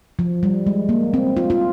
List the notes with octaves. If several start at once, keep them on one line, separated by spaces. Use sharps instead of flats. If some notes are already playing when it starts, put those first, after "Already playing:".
F3
G3
G#3
A#3
C4
F4
F4